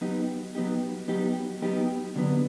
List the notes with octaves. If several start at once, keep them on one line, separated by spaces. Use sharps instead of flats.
F#3 B3 D#4 G4
F#3 B3 D#4 G4
F#3 B3 D#4 G4
F#3 B3 D#4 G4
D3 F#3 B3